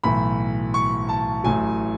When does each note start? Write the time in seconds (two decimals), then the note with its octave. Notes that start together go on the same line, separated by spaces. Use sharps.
0.04 B1 A2 E3 B5
0.74 C#6
1.09 A5
1.44 A1 A2 F#3 G#5